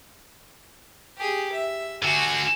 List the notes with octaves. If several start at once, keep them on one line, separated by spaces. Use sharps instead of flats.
G4 G#4
E5
D3 F#4 G#5